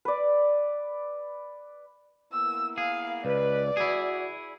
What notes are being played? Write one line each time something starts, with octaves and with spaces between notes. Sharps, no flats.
B4 D5
A#3 B3 E4 E6
G#4 F5
C#2 B4 D5
E4 F#4 G#4